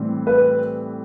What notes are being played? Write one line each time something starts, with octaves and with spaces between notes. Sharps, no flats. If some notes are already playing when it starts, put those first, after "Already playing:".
Already playing: A2 E3 G3 C4
B4